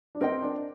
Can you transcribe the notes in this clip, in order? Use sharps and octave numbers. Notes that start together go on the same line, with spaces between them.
D4
C4 A#4 D#5 G5
D4